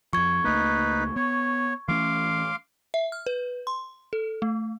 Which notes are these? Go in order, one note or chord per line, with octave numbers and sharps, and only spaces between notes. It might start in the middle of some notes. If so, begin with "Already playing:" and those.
F2 F3 C#6 G#6
C#2 A3 A#3 D#4 B4
B3 C#5
E3 A3 C#4 F5 C6 D6
E5
F6
B4
C6
A4
A3